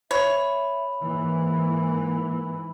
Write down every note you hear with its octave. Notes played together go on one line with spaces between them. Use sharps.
C#5 E5 B5
G#2 E3 A#3